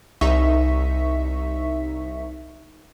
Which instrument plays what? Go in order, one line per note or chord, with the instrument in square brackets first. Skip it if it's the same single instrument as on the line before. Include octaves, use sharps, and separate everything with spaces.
[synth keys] C2 D#4 E5 C#6 B6